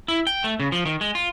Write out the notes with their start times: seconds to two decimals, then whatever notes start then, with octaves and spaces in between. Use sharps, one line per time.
0.08 E4
0.27 G5
0.44 A3
0.60 C#3
0.72 F3
0.86 D#3
1.01 G#3
1.15 F4